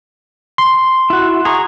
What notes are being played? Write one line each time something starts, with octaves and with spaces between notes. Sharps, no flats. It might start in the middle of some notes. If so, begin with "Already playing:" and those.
C6
E4 F#4
G#4 A#5 C#6